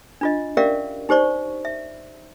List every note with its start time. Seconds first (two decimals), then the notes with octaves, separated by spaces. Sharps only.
0.21 D4 F4 D#5
0.57 C#4 G4 A#4 D5 E5 F5
1.09 D#4 G4 C5 D5 C#6
1.65 E5